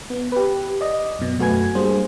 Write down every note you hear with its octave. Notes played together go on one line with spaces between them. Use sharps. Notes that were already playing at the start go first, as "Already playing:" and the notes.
B3
G4 B4
D5 D#5
F#2 B2
F#2 A3 F#4 B4 G#5 G#6
G3 A#3 D4 G#4 C5